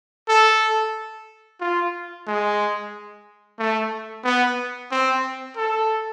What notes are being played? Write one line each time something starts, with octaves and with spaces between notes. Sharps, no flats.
A4
F4
G#3
A3
B3
C4
A4